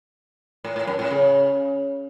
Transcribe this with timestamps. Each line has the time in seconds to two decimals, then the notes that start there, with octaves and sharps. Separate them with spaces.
0.64 A2
0.76 A2
0.87 F#2
0.99 A2
1.10 C#3